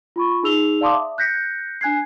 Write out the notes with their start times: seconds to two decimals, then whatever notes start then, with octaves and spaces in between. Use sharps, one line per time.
0.16 F4 B5 C#6
0.43 D#4 G#4 E6 F7 G7
0.81 D5 F5 A5 C6 D6 D#6
0.93 E5
1.18 F#6 G6 A#6 B6 C#7
1.81 D4 G#5 F#6 G#6 C7